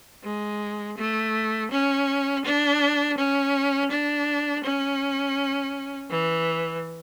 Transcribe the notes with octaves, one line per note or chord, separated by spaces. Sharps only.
G#3
A3
C#4
D4
C#4
D4
C#4
E3